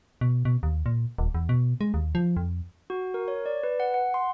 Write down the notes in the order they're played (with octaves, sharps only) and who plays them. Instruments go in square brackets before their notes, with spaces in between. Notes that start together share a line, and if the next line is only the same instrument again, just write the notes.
[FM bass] B2
B2
D#2
A#2
D#1
E2
B2
G#3
D#2
F3
F2
[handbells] F#4
A#4
C#5
D5
B4
F#5
F#5
C6